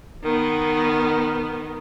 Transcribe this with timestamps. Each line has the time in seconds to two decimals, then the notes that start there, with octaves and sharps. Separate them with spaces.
0.23 D#3 B3